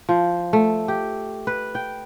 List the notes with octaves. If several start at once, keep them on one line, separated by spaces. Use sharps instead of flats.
F3
A3
G4
B4
G5